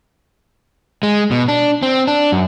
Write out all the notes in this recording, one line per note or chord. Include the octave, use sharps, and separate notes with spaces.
G#3
B2
D4
C4
D4
F#2